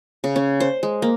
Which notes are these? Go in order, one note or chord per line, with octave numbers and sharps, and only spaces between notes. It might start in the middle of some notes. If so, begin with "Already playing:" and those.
C#3
C#4
C5
G#3
A#3